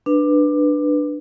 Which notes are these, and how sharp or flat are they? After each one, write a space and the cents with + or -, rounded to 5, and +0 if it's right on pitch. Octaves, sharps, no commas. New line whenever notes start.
D4 +15 B4 +0